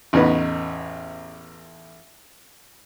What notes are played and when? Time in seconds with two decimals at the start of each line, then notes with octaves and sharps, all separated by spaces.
0.13 A1 E2 D#4 B4